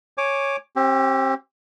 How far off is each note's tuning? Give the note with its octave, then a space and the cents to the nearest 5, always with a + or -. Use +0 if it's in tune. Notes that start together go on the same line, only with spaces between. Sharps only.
C#5 -5 G#5 +0 D6 +0
C4 +35 G4 -20